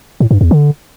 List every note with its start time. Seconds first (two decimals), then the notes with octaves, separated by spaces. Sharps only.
0.20 A2
0.31 G2
0.41 E2
0.51 D3